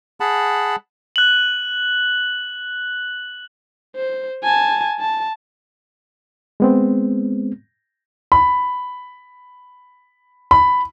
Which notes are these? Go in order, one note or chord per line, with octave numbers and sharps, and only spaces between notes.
G#4 F#5 A5 B5
F#6 F#7
C5
G#5 A5
A5
G#3 B3 C4
B5
B5